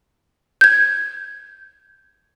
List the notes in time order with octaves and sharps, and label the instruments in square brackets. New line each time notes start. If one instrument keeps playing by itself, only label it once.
[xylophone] G6 G#6